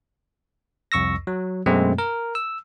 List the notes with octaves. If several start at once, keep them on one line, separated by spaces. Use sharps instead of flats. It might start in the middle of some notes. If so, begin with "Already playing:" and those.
C2 F2 C#6 E6 A#6
F#3
F#2 B2 G#3 A3 C4
A#4
E6